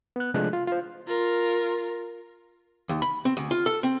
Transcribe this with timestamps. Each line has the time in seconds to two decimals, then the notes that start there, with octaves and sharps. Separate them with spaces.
0.16 B3 F#6
0.34 C3 F3 G#3 A3 D4 F#6
0.53 F4
0.68 F4 C5
1.07 F4 A#4
2.89 D#2
3.02 B5
3.25 C4
3.37 D2
3.51 F4
3.66 A4
3.83 C4